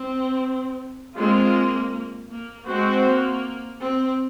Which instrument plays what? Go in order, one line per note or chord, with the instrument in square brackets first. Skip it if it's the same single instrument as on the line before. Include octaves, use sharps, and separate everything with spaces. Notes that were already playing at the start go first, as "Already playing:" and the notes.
Already playing: [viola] C4
[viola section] G#3 C4 F4 [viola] A#3
[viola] A#3
[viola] G#3 [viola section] C4 F#4 C5
[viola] A#3
C4